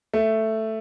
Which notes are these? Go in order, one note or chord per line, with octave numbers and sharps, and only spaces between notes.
A3